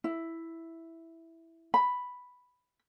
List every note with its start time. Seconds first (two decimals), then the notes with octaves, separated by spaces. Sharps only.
0.04 E4
1.74 B5